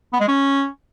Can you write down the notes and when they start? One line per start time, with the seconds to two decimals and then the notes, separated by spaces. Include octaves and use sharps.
0.13 B3
0.21 G#3
0.28 C#4